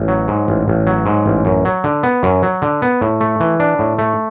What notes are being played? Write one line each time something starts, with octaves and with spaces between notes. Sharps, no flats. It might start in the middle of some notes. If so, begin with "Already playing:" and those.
Already playing: A1
F#3
G#2
A1
A1
F#3
G#2
A1
F#2
F#3
D3
B3
F#2
F#3
D3
B3
A2
A3
E3
D4
A2
A3